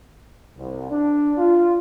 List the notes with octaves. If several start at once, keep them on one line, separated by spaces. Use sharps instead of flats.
C2
D4
F4